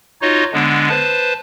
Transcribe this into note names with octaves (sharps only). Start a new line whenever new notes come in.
D#4 F4 F#4 C#5 D#5
D3 G#3 B3 D4
B4 C5 A5